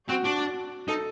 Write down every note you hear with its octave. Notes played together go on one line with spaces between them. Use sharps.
C4 F#4
D4 F#4
D#4 A4